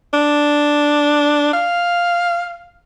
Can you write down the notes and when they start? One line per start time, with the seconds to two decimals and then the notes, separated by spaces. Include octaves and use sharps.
0.13 D4
1.53 F5